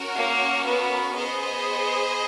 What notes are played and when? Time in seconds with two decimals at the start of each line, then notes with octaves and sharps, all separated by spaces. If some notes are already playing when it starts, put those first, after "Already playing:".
Already playing: C#4 F#4 A#4
0.15 A#3
0.66 B3
1.16 B3 G#4 C5 D#5